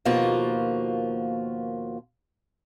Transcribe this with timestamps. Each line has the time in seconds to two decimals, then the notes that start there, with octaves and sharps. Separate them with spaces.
0.05 D#2 B2 F3 A#3 F4 F#4